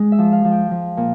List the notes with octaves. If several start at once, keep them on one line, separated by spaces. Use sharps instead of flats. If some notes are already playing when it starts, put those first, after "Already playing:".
Already playing: G#3
E5
F3
F5
F3
G5
F3
A#2